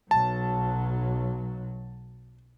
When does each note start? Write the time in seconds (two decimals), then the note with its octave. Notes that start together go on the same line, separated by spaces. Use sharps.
0.11 B1 F#3 A5